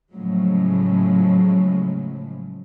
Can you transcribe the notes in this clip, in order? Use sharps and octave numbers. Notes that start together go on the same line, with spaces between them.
A2 C#3 F3 F#3 G#3